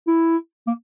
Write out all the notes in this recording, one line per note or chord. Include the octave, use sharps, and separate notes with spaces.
E4
A#3